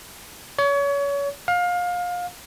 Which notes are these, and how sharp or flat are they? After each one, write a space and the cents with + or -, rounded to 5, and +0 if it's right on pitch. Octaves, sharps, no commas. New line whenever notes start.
C#5 +30
F5 +25